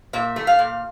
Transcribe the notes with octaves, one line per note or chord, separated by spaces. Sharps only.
A#2 E5
A3
F5
A#2